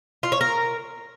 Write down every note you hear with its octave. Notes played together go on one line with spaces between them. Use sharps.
F4
C#5
A#4